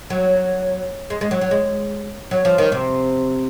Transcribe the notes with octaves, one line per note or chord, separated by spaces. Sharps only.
F#3
G#3
G#3
F#3
F#3
G#3
F#3
F3
D#3
C3